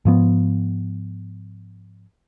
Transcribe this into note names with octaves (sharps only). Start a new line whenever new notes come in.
G#2 F3 B3